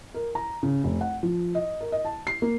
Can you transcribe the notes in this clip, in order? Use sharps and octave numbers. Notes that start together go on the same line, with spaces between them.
A#4
A#5
C#3
F1
F#5
F3
D#5
A#4
D#5
A5
C7
A#3